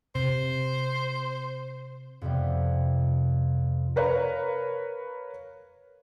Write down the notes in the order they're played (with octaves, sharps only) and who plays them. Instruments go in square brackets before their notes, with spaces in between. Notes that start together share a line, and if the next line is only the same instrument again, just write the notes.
[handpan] C3 [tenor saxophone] C5
[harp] F2 C3 G3 B3
[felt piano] A#4 B4 C#5 F5 A#5